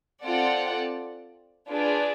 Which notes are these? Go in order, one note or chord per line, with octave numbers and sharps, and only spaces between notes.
C4 F4 A4 D5 F#5
D4 F4 G#4 B4 D5